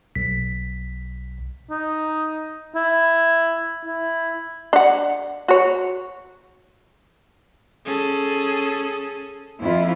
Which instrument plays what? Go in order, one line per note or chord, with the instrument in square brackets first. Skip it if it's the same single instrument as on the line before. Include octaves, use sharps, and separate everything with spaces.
[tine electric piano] B1 B6
[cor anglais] D#4
E4
E4
[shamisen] D4 F#5
F#4 C#5
[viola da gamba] C#4 G#4 A4
[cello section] F2 E4 F4